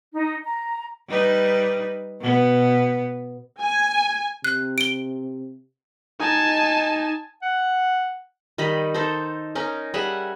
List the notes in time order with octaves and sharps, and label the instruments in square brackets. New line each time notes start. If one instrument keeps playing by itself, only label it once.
[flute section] D#4
A#5
[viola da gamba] G3 D#4 B4
B2 B3
[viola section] G#5
[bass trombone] C3 [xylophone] F#6
[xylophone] D7 G7
[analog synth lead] D#4 [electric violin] G#5 A5
[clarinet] F#5
[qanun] D#3 G3 D#5 B5
D#4 A4 C5
C#4 D#4 A#4
G3 G#4 E5 F#5